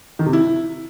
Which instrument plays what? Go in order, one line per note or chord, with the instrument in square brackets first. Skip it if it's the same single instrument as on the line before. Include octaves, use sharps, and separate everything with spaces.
[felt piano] D#3
C3
E4